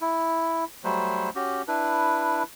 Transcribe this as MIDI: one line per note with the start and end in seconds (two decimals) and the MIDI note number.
0.01 0.64 64
0.84 1.30 54
0.84 1.30 55
0.84 1.30 57
0.84 1.30 72
1.35 1.62 61
1.35 1.62 66
1.35 1.62 67
1.68 2.43 62
1.68 2.43 64
1.68 2.43 71